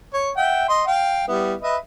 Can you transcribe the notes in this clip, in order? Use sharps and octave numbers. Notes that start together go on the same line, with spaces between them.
C#5
E5 F#5 G5
D#5 C6
F5 G5
G3 B3 E4
B4 D#5 E5